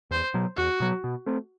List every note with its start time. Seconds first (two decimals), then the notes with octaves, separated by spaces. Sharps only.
0.11 E2 C5
0.34 B2 F#3
0.57 E2 F#4
0.80 B2 F#3
1.04 B2
1.26 A3 C4